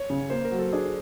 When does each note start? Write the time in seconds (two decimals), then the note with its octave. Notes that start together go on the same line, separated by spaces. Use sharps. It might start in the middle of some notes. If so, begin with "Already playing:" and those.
Already playing: C#5
0.10 C#3
0.30 A#3 C5
0.45 A#4
0.51 F#3
0.59 A4
0.73 D4 G#4